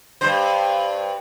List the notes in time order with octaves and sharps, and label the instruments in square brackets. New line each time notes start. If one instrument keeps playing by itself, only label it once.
[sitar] G2 C5